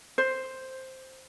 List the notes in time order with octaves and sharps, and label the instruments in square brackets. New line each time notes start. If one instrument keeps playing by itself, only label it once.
[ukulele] C5